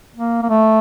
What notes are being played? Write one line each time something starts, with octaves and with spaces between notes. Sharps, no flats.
A#3
A#3
A3